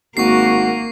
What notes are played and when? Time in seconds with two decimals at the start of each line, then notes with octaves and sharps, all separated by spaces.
0.17 G#1 A#3 F#4 C#6 C7